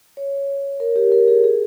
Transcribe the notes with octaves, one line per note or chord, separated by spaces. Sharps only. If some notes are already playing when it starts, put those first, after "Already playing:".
C#5
A#4
G4
A#4
G#4
G#4